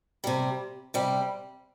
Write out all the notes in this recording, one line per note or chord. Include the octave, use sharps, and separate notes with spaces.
C3 G3
C3 G3